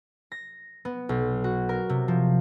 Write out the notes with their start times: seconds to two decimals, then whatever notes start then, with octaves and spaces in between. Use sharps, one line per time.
0.32 A#6
0.85 B3
1.09 B1
1.44 F#4
1.69 A#4
1.89 C3
2.08 F3